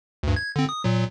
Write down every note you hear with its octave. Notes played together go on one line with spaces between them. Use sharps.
D2 G2
G#6
D3 C4
D#6
A#2 F#3